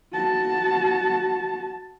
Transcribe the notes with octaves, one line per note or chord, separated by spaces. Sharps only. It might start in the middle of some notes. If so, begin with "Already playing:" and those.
F#4 A5